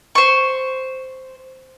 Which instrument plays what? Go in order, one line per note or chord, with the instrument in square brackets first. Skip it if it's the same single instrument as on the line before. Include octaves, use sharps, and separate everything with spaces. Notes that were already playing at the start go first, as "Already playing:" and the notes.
[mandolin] C5 C#6